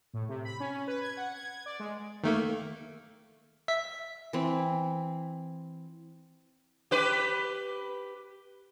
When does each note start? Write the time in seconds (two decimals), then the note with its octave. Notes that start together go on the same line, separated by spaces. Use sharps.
0.14 A2
0.29 C3
0.45 B5
0.60 C#4
0.87 B4
1.02 G#6
1.17 F#5
1.34 G#6
1.66 D5
1.80 G#3
2.24 D#3 A3 A#3
3.68 E5 B6
4.33 E3 C4
6.91 G4 B4